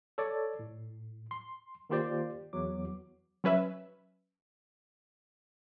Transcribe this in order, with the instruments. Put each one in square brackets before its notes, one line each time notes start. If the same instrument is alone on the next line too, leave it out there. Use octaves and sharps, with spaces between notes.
[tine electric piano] A4 C#5 D5
A2
C6
D#3 A#3 F4 G4 C5 D5
E2 F#3 D6
[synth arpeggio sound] F#3 C#4 B4 E5